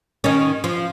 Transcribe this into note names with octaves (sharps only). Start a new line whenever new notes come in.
D#3 C#4
F3